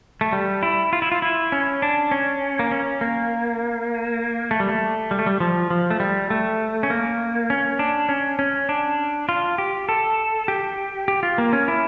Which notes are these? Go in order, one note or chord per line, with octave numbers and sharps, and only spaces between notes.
A3
G3
E4
F4
E4
F4
E4
C#4
D4
C#4
A#3
C#4
A#3
A3
G3
A3
G3
A3
G3
F3
F3
A3
G3
A3
C#4
A#3
C#4
D4
C#4
C#4
D4
F4
G4
A4
G4
G4
F4
A#3
C#4
E4